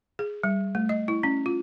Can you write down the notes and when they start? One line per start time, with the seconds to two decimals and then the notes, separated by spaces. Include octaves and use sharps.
0.19 G#4
0.44 G3
0.75 A3
0.89 D#5
1.08 E4
1.23 C#4
1.46 F4